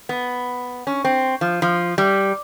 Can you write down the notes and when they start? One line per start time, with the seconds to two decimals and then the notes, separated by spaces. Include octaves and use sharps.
0.09 B3
0.87 C#4
1.05 C4
1.41 F3
1.62 F3
1.98 G3